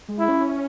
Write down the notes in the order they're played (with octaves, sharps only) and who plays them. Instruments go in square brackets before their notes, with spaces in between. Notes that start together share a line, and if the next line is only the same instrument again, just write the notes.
[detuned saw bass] G#3
[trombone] E4
[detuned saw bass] C#4